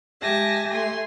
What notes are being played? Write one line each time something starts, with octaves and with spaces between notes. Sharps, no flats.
G#3 G4 E5 G#5 A5 A#6
A3 G#5 C6